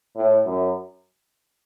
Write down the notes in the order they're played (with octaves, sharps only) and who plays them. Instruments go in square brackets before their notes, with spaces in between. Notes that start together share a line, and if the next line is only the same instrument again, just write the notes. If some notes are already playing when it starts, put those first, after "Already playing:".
[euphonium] A2
F#2